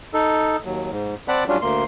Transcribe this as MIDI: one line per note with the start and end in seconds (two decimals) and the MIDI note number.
0.14 0.57 63
0.14 0.57 69
0.65 0.91 39
0.65 0.91 54
0.91 1.15 44
1.28 1.44 60
1.28 1.44 74
1.28 1.44 78
1.28 1.44 81
1.28 1.44 83
1.48 1.57 54
1.48 1.57 55
1.48 1.57 61
1.48 1.57 62
1.48 1.57 65
1.62 1.84 38
1.62 1.84 58
1.62 1.84 84